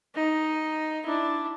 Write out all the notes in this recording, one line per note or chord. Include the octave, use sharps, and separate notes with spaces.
D#4
D4 E4